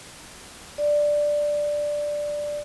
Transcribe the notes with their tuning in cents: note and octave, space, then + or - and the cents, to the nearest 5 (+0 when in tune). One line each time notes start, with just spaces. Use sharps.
D5 +5